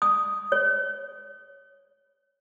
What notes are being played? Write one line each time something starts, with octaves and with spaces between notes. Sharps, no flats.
D#6
C#5